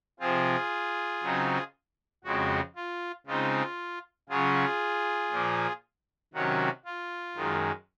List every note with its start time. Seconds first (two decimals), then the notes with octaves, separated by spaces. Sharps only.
0.19 C3 F3 C4 F4 G#4
1.22 C#3 F#3 C4 D#4
2.24 F2 C#3 G#3 C4 F#4
2.76 F4
3.26 C#3 G#3 C4 D#4 F4
4.29 C#3 F#3 C#4 F4 G#4
5.31 A#2 F3 A#3
6.34 C3 D#3 F#3 C#4 F#4
6.85 F4
7.35 F#2 D#3 G#3